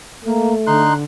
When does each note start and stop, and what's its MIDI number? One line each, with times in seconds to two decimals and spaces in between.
0.24 0.86 57
0.24 0.53 58
0.67 1.03 50
0.67 0.93 63
0.67 0.93 84
0.67 0.93 90